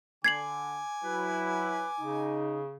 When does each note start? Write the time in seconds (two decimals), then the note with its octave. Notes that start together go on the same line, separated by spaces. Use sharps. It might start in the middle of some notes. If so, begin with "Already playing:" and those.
0.24 D3 G#5 D6 G#6 C7 F#7
1.04 F#3 E4 B4
1.99 C#3 D#4